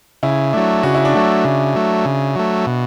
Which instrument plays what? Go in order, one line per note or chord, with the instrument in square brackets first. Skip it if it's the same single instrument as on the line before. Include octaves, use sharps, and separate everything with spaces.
[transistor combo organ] C#3 [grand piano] E4
[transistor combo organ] F#3 A3 [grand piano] D4
[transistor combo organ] C#3 [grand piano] F#4
[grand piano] E4
D4
[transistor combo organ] F#3 A3 [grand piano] E4
[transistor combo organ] C#3
F#3 A3
C#3
F#3 A3
B2